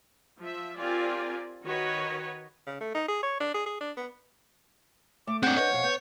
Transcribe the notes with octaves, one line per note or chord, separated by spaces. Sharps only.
F3 E5
C4 F4 G4 A#4 D5 G#5
D#3 F#4 B4 C#5 D#5
C#3
A3
D#4
G#4
C#5
D4
G#4
G#4
D4
B3
A3 D6
C4 D4 F#5 G6
D4 B4 C#5 D#5
F2 B2 F5
B3 G6